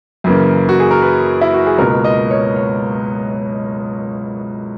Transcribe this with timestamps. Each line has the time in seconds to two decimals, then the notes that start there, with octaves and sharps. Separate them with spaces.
0.24 F#2 C#3 E3 A#3
0.69 F#4
0.80 G#4
0.91 A#4
1.02 B4
1.41 E4
1.54 F#4
1.67 G#4
1.79 C#2 B2 A#3 A#4
2.04 D#5
2.31 C#5
2.56 C#5